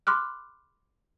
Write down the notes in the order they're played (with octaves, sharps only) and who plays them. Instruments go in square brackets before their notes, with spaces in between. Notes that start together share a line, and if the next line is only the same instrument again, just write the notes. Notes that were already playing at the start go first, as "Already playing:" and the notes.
[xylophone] B5 C6 D6 F6 F#6